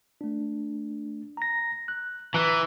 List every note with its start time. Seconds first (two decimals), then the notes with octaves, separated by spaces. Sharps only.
0.21 A3 D4
1.37 A#5 A#6
1.88 F#6
2.34 E3 A#5 C#6 F#6